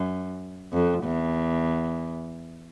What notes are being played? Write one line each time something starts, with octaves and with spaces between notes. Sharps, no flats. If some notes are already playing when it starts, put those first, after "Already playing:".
Already playing: F#2
F2
E2